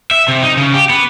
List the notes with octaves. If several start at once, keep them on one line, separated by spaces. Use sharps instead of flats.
E5
C3
D#4
C#3
G4
B3